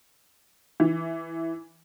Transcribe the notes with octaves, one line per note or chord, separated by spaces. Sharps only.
E3